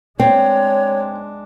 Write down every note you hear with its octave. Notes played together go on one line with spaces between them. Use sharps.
G#3 C4 D4 C#5